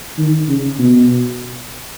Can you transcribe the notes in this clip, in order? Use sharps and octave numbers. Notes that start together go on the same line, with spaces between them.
D#3
C#3
B2